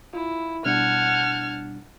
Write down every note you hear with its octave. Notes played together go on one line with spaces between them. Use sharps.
E4 F4
B2 G3 D4 F#5 A5 F6 G#6